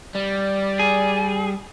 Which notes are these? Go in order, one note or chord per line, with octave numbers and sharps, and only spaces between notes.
G3 D5
G#4